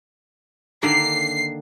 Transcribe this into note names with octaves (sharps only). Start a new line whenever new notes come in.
D3 D#3 A#3 C7